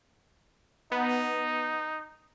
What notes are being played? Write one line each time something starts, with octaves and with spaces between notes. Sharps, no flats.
B3 D#4